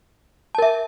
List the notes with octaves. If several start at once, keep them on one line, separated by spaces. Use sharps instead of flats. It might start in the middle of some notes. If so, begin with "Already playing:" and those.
A#4 E5 A5